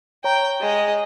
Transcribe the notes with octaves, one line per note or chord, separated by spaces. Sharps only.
C#5 G5 A#5
G#3 D#5